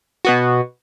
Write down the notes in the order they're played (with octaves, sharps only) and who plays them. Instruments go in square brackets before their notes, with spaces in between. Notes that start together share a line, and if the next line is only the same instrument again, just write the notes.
[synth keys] B2 B3 F#4